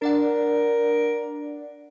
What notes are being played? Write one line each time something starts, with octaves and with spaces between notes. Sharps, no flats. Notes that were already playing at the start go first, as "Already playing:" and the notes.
D4 A#4 D5 F#5